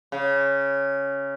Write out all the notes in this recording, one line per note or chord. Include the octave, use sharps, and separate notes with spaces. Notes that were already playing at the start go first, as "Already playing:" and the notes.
C#3